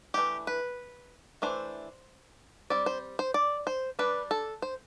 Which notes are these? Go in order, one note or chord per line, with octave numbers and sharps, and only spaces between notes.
E3 A3 D4 G4
B4
E3 A3 D4 C5
G3 C4 D5
C5
C5
D5
C5
G3 D4 B4
A4
C5